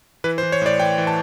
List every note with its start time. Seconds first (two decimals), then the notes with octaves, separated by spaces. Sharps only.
0.24 E3 B4
0.38 C5
0.43 E3
0.52 C#5
0.62 A2 D5
0.80 E3 G5
0.98 E3
1.07 A5